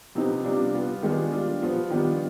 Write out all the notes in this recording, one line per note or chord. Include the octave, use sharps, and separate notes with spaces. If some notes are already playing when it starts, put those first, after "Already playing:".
C3 F3 B3 D#4
C3 G3 D4 F4
G3 B3 F4
D#3 G#3 B3 D4 F4
G3 D4 F4
F3 B3 F4
D#3 G3 B3 D4 F4